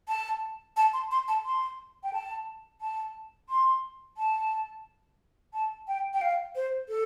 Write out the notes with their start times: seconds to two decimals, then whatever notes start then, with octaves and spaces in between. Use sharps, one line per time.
0.09 A5
0.77 A5
0.93 C6
1.11 C6
1.28 A5
1.45 C6
2.03 G5
2.13 A5
2.81 A5
3.49 C6
4.17 A5
5.53 A5
5.88 G5
6.14 G5
6.21 F5
6.56 C5
6.89 A4